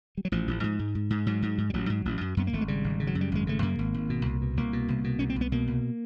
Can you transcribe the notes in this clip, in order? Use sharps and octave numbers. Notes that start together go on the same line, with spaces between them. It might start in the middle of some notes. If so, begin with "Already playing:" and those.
G3
F#3
A1 F3
A1
G#2
G#2
G#2
G#2
G#2 F#3
G#2
G#2
G3
A1 F#3
G#2
A1
F#2
F#2 B3
A#3
G#1 A3
G#3
C#3 G3
G#1
C#3
F#3
F#2
G3
G#1 G#3
C#3 A3
F#2 A#3
G#1
G#1
B2
C2
B2
C2 A#3
B2
C2
B2
C2 C#4
C4
C2 B3
B2 A#3
C2